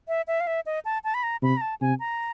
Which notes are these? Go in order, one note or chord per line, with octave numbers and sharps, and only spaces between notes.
E5
E5
F5
E5
D#5
A5
A5
B5
A#5
C3 B5
A#5
A5
C3 G#5
A#5